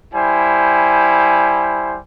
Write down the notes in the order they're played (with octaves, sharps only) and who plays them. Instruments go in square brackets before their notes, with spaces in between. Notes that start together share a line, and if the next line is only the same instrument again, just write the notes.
[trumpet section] G3 E4 C5 G#5